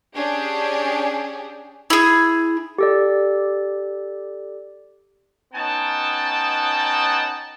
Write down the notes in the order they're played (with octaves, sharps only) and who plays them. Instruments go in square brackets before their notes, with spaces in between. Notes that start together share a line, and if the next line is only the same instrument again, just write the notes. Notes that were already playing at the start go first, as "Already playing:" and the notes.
[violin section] C#4 D4 G4 G#4
[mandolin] E4 G#4
[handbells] G4 A4 D5
[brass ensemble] B3 C#4 D#4 F#5 G5 A5